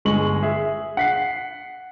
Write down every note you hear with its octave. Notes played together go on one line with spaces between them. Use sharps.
G1 G#3 C#6 F#7
G#4 E5
F#5 B6 C7